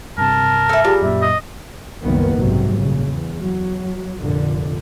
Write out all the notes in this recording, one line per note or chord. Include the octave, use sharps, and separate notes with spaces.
G2 C3 A#4 A5
A4 E5
G3 F4 G#4
F#2 A#2 E5
D#5
F#1 C2 F#2 D#3 A#3 B3
B1 G#2 C3 F#3 G3
A#1 C#3
E2
F#3
F1 A#2 D3